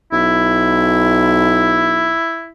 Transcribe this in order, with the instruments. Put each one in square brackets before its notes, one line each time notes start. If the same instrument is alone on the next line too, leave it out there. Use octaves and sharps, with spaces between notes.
[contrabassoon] B1 [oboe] E4